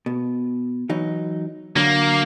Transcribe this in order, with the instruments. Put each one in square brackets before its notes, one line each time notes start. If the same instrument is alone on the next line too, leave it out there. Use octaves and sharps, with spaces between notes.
[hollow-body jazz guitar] B2
E3 F#3 D#4
[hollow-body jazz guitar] D3 F#3 [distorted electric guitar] A#3